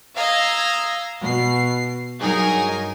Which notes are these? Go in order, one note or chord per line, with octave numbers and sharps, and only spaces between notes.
D#5 F5 A#5 E6 G#6 A#6
B2 C7
G2 F#3 D#4 G#4 A#4 G#5